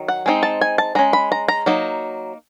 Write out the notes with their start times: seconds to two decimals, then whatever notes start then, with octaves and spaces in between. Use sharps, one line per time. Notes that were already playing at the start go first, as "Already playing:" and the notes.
Already playing: D#3 F#3
0.08 F#5
0.26 G#3 C4 D#4
0.43 A5
0.61 G#5
0.78 A5
0.95 G#3 C#4 A#5
1.13 B5
1.32 A#5
1.48 A#5
1.66 F#3 A#3 D#4